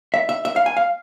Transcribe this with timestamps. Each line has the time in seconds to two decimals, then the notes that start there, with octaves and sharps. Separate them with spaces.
0.14 E5
0.29 E5
0.45 E5
0.56 F5
0.66 G#5
0.77 F5